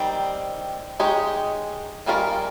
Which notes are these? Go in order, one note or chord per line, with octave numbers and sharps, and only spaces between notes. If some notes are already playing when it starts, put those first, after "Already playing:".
Already playing: D#3 G3 C4
G#3 D#4 G4 C#5
D#3 G3 C#4 F4 A#4